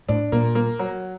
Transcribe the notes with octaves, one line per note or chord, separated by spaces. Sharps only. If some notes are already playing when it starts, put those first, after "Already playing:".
A2 D4
A#2 A#3
A#3
F#3